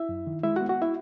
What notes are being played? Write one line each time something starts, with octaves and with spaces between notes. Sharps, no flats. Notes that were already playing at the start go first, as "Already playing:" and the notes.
Already playing: E4 E5
F#2
D#3
G#3 E4 E5
F#4 F#5
B3
F#4 F#5
E4 E5